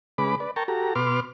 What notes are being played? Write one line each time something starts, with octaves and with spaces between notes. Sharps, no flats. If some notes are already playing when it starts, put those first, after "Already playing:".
C#3 G#3 B4 B5 D6
B4 D5
A#4 G5 A5 A#5 C#6
F#4 G4 A4 A#5
B2 B4 C6 D6 F6